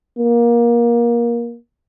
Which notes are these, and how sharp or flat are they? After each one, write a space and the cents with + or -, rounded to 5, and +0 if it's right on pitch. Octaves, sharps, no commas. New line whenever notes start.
A#3 +20